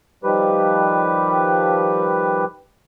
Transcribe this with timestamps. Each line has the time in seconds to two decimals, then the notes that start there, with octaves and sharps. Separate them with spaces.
0.24 D#3 F3 G3 G4 B4